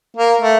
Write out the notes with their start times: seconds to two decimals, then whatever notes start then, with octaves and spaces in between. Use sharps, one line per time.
0.17 A#3
0.41 A3